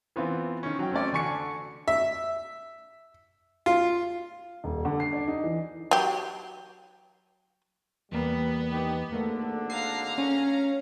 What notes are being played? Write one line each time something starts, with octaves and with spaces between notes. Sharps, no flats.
E3 B3 C4 F4
D#3 C#4
F#3 G5
A3 C4 C#4 D5
D3 F#4 G#5 C#6 C#7
E5
F4
D#1
D3
C7
D4
D#4
E3
F#3 G4
E2 G3 A#3 B3
D#3 D#4 G4
G#1 D3 A3 A#3
F5 A#5 C7
C#4